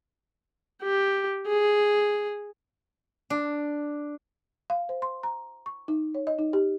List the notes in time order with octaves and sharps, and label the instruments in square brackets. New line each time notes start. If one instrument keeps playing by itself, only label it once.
[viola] G4
G#4
[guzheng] D4
[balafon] F5
C5
C6
A#5
C#6
D#4
C#5
D#5
D#4
G4